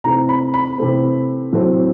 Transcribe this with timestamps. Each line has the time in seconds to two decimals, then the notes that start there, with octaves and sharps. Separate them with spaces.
0.04 C3 E3 A3 C4 A#5
0.29 B5
0.54 B5
0.78 C3 E3 A3 C4
1.52 A2 F#3 A3 C4